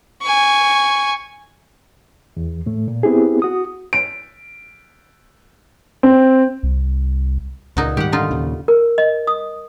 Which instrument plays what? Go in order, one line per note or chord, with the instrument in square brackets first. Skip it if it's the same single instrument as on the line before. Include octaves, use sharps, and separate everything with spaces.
[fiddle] G#5 C#6
[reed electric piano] E2
A2 A3
A#2
B3 C4 E4 G4 G#4
F#4 D#6
[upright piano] D7
C4
[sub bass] C2
[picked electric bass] C#2 [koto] A#2 D#4 F#4
[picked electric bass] G#2 D#3 G3 [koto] G4 F#5
[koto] D3 D#4 F4
[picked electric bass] D#2 A#2 C#3
[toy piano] A#4
D#5
D#6